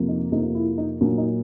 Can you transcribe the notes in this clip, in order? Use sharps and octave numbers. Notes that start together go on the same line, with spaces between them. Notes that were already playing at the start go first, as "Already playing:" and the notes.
Already playing: F2 C3 F3 A#3
D#4
F2 C3 F3 A#3 D#4
E4
D#4
A#2 F#3 A#3 D4
D#4